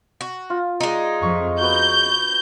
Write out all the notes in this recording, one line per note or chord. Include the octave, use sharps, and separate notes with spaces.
F#4
F4
G#3 D#4 D5 D#5
F2 C#6
B3 F#4 G6